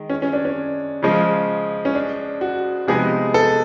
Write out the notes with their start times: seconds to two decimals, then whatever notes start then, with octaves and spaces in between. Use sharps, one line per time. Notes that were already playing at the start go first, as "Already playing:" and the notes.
Already playing: D#3 G#3
0.09 C#4
0.22 C#4
0.33 D4
0.45 C#4
1.02 C#3 F3 G#3
1.85 C#4
1.95 D4
2.41 F#4
2.87 C3 F3 G#3 B3 D#4 G#4
3.34 A4